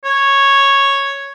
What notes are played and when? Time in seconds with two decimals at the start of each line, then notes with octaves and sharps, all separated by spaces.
0.04 C#5